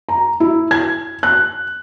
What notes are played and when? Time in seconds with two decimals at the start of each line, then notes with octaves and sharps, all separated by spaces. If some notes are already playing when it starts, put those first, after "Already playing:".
0.09 A#5
0.40 E4
0.71 G#6
1.23 F#6